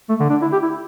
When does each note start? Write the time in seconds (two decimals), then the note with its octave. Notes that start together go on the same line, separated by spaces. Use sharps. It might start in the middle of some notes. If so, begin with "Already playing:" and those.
0.09 A3
0.20 D3
0.30 D4
0.42 E4
0.53 G4
0.63 E4